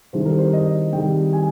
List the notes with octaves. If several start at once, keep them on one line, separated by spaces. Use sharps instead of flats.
C2 C3 D#3 G3 C5
A#4
C5
D#5
C2 C3 D#3 G3 G5
G#5